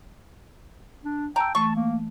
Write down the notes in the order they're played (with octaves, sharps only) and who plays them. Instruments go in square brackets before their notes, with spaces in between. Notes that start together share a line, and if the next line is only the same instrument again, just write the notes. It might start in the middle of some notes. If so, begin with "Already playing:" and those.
[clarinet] D4
[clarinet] G5 [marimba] A5 E6 [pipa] A#5
[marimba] E3 A3 [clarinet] A5 [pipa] C#6
[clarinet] A#3